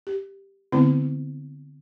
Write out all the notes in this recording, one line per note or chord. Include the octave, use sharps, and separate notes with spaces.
G4
D3 E3 A3 B3 C4 E4